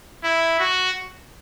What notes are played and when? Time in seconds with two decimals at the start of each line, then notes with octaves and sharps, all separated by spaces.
0.24 E4
0.60 F#4